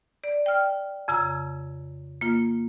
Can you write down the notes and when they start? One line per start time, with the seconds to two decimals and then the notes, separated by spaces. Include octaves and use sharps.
0.24 D5
0.46 G5 F6
1.08 F2 C#3 A#5 E6
2.21 A#3 F4